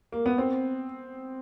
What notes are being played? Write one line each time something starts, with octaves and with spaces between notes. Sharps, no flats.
A#3
B3
C4